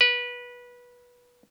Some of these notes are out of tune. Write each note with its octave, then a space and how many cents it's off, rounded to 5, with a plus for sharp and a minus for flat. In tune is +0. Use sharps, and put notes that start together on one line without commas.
B4 -20